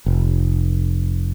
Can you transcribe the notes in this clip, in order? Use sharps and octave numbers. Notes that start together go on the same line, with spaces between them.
F1